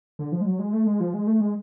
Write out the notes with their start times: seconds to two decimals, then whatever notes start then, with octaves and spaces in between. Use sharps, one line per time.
0.19 D3
0.32 F3
0.41 G#3
0.45 F#3
0.59 G#3
0.73 A3
0.86 G#3
1.00 F3
1.14 G#3
1.27 A3
1.40 G#3